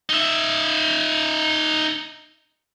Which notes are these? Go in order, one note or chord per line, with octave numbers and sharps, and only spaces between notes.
D#4 E5